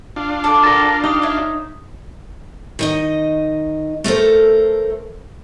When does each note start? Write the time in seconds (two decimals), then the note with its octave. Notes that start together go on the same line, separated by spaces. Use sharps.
0.16 D4 F4
0.44 A4 D5
0.64 A#4 A5
1.04 D#4 G4
1.22 C#5 E5
2.79 D#3 D#4 D#5
4.04 A3 A4 A#4 C5